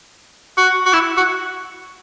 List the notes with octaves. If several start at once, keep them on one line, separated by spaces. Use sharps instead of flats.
F#4
F#4
E4
F#4